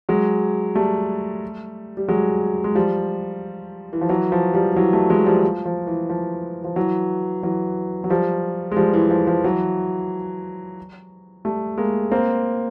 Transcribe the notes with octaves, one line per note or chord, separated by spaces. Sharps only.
F#3 G#3
G3 A3
G3
F#3 G#3
G#3
F3 G3
E3
F3
E3 F#3
F3
F3 G3
G3
E3 F#3
G3 A3
F#3 G#3
F3 G3
F3
F3
E3
F3
F3
E3 F#3
E3 F#3
F#3
F3 G3
G#3
F3 G3
E3
F3
F3
E3 F#3
G3 A3
G#3 A#3
A#3 C4